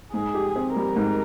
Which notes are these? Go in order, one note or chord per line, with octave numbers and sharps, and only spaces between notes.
G#2 G#4
G4
C4
G3 A#4
G#2